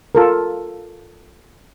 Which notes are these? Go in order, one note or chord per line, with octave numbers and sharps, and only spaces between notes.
F4 A4 A#4